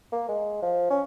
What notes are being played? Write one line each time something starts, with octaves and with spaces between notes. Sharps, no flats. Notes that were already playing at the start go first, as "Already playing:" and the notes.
A#3
G#3
F3
C#4